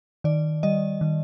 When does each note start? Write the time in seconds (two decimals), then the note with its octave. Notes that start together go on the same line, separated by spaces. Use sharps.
0.24 D#3 D5
0.63 G3 D#5
1.01 D#3